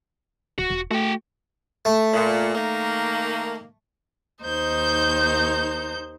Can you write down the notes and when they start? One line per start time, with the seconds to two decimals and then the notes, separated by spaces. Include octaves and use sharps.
0.58 D1 F#4
0.70 E1
0.91 A3 F#4 G5
1.85 A3
2.13 A#2
2.55 D#3 A#3
4.43 D#2 D#4 C5 G6